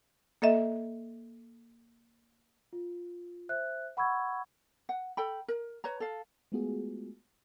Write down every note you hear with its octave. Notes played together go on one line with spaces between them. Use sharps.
A#3 A4 D#5 E5
F4
C5 E5 F#6
F#5 B5 C#6 E6 G#6
F#5
A4 G5 B5
A#4
B4 C#5 A#5
A4 F5
G#3 A3 B3 F4 F#4 G#4